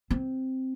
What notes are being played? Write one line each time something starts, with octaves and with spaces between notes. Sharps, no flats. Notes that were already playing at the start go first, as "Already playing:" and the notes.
C4